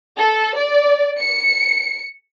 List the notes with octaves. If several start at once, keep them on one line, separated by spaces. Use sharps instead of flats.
A4
D5
C#7